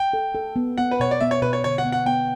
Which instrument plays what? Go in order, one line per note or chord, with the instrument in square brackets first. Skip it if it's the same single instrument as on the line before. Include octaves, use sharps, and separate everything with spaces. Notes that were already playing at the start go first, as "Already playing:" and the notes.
Already playing: [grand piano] G5
[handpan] A4
A4
B3
[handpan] B3 [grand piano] F#5
[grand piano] B4
[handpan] B2 [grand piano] C#5
[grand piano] D5
[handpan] B3 [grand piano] E5
[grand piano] C#5
[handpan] B2 [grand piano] B4
[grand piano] C#5
[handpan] D3 [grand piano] C#5
[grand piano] F#5
[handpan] B3
[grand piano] F#5
[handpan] B3 [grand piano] G5